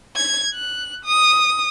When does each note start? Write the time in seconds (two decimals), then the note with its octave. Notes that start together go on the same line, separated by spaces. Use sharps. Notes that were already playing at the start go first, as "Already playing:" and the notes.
0.17 G#6
0.54 F#6
1.05 D#6